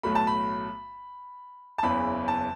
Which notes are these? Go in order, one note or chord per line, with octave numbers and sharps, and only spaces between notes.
B1 A2 F#3 A3 B5
A5
B5
A5
F#1 E2 C#3 E3 B5
A5